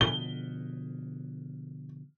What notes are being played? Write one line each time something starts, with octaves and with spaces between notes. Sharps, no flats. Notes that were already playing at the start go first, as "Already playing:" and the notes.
B2 D3 F3 G7